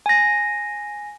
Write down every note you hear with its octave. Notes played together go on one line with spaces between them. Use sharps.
G#5 A#6